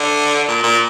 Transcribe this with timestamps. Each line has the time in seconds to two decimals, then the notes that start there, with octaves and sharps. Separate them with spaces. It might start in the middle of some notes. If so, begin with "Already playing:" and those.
Already playing: D3
0.48 A#2
0.63 A#2